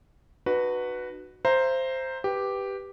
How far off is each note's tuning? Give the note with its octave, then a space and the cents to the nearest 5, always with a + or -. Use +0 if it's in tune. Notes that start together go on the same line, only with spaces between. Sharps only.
D#4 -45 F#4 +0 B4 +0
C5 +0 E5 +40 A#5 +0
G4 +0 B4 -5